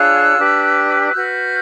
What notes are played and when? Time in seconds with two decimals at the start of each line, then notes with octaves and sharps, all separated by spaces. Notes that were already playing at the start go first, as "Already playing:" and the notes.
Already playing: D4 F4 G#4 C#5 E6 F#6
0.38 D4 G4 B4
1.12 F#4 B4 F6 G6